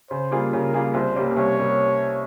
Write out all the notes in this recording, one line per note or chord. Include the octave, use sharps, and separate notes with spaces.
C#3 C5
G3 A#3 F4 G#4
C#3 A#4
G3 A#3 F4 G#4
C2 C5
C3 G3 A#3 C#4
C2 C#5
C3 G3 A#3 C#4